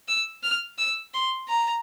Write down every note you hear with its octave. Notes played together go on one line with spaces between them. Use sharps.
E6
F6
E6
C6
A#5